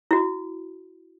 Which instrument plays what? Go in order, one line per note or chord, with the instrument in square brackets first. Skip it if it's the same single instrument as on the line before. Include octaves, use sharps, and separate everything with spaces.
[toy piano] E4 F#4